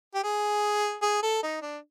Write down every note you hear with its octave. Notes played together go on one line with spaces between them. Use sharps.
G4
G#4
G#4
A4
D#4
D4